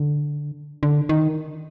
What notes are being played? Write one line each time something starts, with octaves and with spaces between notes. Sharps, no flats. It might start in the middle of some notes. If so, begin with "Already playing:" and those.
Already playing: D3
D3
D#3